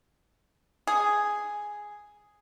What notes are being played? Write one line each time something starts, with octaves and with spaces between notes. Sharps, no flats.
G#4